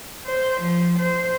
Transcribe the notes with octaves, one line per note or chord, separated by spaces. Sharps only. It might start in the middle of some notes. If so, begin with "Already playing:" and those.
C5
F3
C5